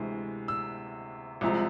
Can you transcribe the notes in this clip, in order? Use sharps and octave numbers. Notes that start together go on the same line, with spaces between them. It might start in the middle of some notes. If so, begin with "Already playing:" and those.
Already playing: D2 C3 E3 G#3
E6
C2 C3 F3 G#3